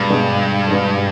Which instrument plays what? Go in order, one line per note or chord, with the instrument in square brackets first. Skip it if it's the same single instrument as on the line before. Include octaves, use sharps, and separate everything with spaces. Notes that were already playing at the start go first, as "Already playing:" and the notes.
Already playing: [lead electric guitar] G2 [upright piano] B2 G#3 B3 G#4
[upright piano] B2 G#3 B3 D4 G#4
B2 G#3 B3 D4 G#4